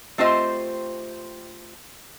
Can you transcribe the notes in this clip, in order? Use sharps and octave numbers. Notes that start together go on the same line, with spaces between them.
A3 C4 F4 G4 C5 D#5